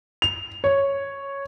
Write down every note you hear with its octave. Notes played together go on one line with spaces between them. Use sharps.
F7
C#5